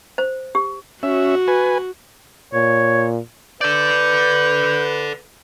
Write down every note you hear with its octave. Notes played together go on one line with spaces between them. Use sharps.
C5
G4
C#4 F#4 E5
B4 G#5
A#2 C#5
A4 B4 D5 G6